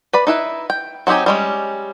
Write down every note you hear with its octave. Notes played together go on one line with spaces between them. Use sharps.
B4 D5 B5
D#4 E4 B4
G5
F#3 C4 D#4 G4 G#5
G3 G#3 C#4